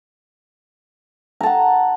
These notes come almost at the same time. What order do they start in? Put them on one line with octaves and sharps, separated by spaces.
A#5 A5 F#5